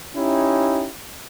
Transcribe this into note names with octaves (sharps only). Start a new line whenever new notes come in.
C#4 D#4 E4 G4